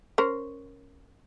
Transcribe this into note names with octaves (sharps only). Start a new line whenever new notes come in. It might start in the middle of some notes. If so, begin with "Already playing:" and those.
C#4 A#4 C5